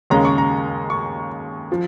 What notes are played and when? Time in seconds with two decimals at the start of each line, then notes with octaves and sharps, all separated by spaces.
0.10 D#2 C#3 G#3 C#4 A#5
0.25 C#6
0.38 A#5
0.90 C#6
1.72 F3